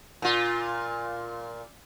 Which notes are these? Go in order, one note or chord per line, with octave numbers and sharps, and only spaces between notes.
A#2 F4